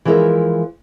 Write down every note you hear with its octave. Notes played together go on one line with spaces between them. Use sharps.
E3 F3 G#3 E4 A#4 E5